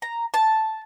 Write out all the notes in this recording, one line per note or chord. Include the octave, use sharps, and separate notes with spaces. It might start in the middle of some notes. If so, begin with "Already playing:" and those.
A#5
A5